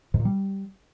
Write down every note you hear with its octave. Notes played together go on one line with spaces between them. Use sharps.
G#2
A#2
G3